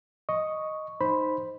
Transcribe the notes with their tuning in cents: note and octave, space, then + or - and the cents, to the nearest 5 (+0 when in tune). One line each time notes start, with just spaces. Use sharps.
D#5 +0 C#6 +0
D#4 +0 C5 +0 B5 +0